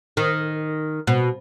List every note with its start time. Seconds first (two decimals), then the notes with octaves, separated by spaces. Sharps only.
0.17 D#3
1.07 B2